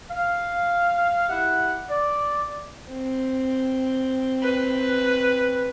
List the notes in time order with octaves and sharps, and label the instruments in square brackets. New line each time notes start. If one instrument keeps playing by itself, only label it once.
[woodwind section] F5
E4 G4 E5 F#5
D5
[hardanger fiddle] C4
[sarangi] B4